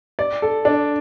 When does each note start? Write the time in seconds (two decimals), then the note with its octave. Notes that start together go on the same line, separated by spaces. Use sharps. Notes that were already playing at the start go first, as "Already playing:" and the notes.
0.19 D5
0.42 A4
0.65 D4